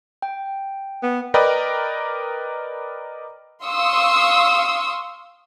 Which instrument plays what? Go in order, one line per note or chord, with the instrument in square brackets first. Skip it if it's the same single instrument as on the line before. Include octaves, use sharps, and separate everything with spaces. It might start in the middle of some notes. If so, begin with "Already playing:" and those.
[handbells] G5
[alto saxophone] B3
[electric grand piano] A#4 B4 D5 D#5 G5
[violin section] F5 C6 C#6 D#6 E6